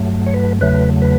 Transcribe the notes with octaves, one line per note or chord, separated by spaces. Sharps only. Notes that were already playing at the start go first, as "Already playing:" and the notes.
Already playing: G2 F#3 A3
C#5
B4
E2 C#3 F#3 A3 B4
B4